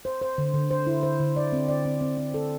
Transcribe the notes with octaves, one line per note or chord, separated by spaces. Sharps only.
C5
C5
D3
D3
C5
E4
C5
D3
D5
C4
D5
C4
C4
C4
A4